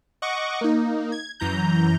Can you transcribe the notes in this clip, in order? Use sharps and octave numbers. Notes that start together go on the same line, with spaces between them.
D#5 F#5 C#6 D6
A#3 D#4
G#6
F#2 E3 A#5 G6